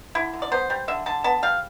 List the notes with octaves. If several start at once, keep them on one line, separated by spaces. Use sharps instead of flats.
D3 E4
D3
D5
B3 C5
G3
D3 E5
D3 A5
B3 A5
G3 F5